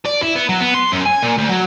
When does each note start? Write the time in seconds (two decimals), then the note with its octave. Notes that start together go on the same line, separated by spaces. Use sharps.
0.05 D5
0.22 E4
0.36 B3
0.49 F#3
0.61 B3
0.74 C6
0.92 F#2
1.06 G#5
1.23 A#2
1.38 D2
1.50 F#3